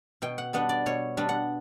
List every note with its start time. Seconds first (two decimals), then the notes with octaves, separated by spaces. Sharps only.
0.22 B2 G5
0.38 F#5
0.53 G3 B3 D4 F#5
0.69 D5
0.86 B2 C#5
1.17 G3 B3 D4
1.29 F#5